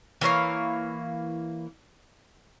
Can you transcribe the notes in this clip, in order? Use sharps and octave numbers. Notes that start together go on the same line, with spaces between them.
E3 A#3 C#5 F5